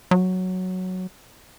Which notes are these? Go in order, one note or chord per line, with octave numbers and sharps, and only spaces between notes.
F#3